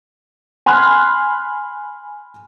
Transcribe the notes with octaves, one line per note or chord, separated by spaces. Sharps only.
G#5 B5 C6 F6 F#6 G#6